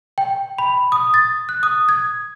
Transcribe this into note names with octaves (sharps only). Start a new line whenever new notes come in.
G5
B5
D#6
A6
F#6
D#6
G#6